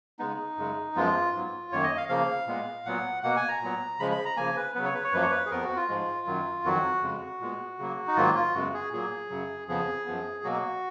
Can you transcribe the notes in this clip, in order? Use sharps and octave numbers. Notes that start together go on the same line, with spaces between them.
C#3 G#3 B3 D#4
F#2 C#3 G#3
F#2 F3 G#3 B3 F4
G#2 F#3 B3
F#2 D#3 A#3 C#5
D#5
F5
C#3 F3 A#3 F5
A#2 G#3 B3
A#2 F#3 B3 F#5
B2 A#3 F#5
G#5
A#5
A#2 F#3 B3
C#3 F3 G#3 B5
B5
A#5
C#3 F3 A#3 G#5
B4
C#3 F#3 B3 B4
C#5
B4
C#5
F#2 F3 A#3 B4
C#5
B4
G#4
F2 F3 B3 A#4
F#4
F4
G#2 F3 G#3
F#2 D#3 F#3
F2 D#3 F#3 F#4
F2 C#3 G#3
A#2 G#3 B3
C#3 F#3 A#3
D#4
G#2 D#3 F#3 A#3 F4
F4
F#2 C#3 G#3 B3 F#4
G#4
A#2 F#3 A#3 G#4
F#2 C#3 F#3
F2 C#3 F3 B3 G#4
F#2 F3 B3
B2 F#3 A#3 F#4